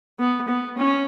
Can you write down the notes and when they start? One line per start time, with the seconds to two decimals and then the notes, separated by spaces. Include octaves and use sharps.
0.19 B3
0.48 B3
0.77 C#4